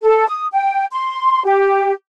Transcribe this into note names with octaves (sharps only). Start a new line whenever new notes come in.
A4
D#6
G5
C6
G4